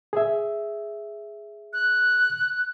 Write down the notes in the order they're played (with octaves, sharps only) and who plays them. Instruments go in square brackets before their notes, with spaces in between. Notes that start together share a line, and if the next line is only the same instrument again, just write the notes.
[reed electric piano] G#4 E5
[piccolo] F#6